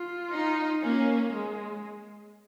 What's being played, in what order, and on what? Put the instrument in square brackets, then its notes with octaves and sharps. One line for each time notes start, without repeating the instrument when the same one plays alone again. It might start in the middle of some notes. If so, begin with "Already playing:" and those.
Already playing: [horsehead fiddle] F4
[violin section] D#4
[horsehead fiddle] A#3 [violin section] C#4
[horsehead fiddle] G#3